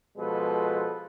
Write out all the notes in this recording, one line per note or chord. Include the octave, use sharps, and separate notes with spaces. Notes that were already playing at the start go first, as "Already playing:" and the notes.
B2 F3 G#3 A4 B4